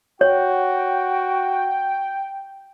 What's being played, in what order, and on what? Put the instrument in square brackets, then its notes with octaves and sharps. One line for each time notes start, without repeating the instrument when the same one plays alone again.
[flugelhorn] F#4 [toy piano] C#5 [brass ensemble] G5